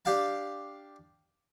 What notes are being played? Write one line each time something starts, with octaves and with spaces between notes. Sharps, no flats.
D4 G4 F5 A5